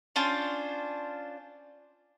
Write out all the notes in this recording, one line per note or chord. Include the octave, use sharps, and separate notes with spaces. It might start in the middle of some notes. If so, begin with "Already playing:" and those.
C#4 D4 F4 C5